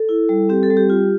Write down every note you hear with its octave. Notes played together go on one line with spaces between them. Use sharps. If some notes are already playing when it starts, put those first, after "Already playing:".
Already playing: A4
E4
G3
C4 G4
A4
G3
G4
F4